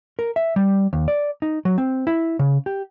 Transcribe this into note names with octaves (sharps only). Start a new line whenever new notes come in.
A#4
E5
G3
D#2
D5
D#4
F#3
C4
E4
C#3
G4